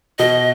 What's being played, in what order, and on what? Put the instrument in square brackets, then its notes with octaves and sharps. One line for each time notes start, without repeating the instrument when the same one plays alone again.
[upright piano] B2 [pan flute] D#5